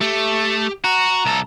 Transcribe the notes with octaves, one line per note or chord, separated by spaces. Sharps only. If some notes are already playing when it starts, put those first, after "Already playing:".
A3 G4
F#4 A#5
C2 A4